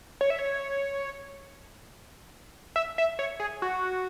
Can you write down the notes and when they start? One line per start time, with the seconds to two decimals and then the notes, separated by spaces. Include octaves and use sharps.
0.21 C#5
0.30 E5
0.39 C#5
2.76 E5
2.98 E5
3.19 C#5
3.40 G#4
3.62 F#4